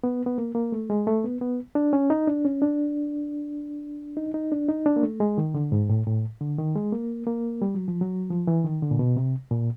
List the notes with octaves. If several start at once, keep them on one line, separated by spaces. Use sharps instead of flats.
B3
B3
A#3
A#3
A3
G#3
A3
B3
B3
D4
C#4
D#4
D4
C#4
D4
D#4
D#4
D4
D#4
D4
A#3
A3
G#3
D#3
D3
G#2
A2
A2
D3
D#3
G#3
A#3
A#3
G3
F#3
F3
F#3
F3
E3
D#3
D3
A#2
B2
C3
A#2